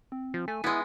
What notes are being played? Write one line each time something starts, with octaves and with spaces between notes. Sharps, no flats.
C4
F3
A3 G#5
G#3 B3 E4